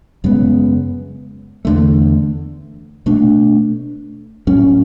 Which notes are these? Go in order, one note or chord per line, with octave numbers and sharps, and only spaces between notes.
F#2 C#3 G#3 B3
E2 D3 A3
B2 A3 D4
A2 F#3 C#4